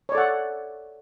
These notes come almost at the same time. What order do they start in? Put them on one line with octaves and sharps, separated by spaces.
C#5 D5 A4 F#5